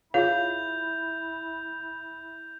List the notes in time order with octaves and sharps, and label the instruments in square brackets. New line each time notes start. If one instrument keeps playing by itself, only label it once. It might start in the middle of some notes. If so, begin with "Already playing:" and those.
[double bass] E4 [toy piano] F4 G#4 C#5 [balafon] F5 [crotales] G6 F7